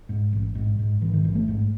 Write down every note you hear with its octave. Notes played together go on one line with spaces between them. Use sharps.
G#2
A1
G#2
G#2
G#2 E3
D#3
A1 E3
A3
G#2